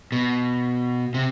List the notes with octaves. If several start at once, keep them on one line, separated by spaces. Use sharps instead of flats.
B2
C3